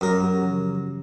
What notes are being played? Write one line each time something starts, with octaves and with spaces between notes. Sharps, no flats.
F#2 A#4 D#6
C#4 G4 F#5
C#3 E3 F3